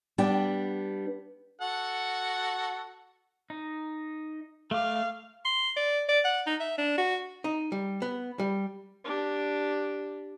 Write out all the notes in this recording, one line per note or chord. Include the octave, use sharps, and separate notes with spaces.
G3 B3 D4 G5
F#4 A4 F#5
D#4
A3 F5 D6
C6
D5
D5
F#5
D#4
E5
D4
F#4
D#4
G3
B3
G3
D4 G4